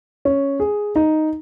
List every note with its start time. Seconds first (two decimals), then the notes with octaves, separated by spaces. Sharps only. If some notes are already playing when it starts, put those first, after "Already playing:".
0.25 C#4
0.60 G#4
0.96 D#4